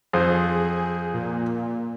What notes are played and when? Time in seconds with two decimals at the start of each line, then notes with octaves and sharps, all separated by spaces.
0.13 F2 G#4 C5 D#6
1.13 A#2